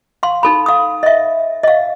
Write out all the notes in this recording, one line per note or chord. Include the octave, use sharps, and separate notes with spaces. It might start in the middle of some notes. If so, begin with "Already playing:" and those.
F5 C6
D#4 A4 B5
F5 D#6
D#5 E5
D#5 F5